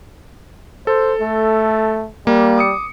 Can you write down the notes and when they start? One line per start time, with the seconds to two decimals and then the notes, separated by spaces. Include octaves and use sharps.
0.87 A4 C5
1.21 A3
2.27 G3 A#3
2.58 D6 D#6 C#7